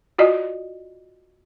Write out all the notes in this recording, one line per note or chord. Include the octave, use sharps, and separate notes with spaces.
F4 F#4 D5 D#5